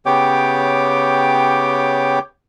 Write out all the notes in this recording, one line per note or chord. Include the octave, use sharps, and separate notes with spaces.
C#3 B3 G4 C#5 G5 D6